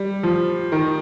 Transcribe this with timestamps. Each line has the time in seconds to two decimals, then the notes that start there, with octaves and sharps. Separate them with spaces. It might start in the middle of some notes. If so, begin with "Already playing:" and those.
Already playing: G3
0.23 F3
0.72 D#3